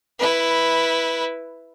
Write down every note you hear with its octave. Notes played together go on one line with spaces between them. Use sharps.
E4 B4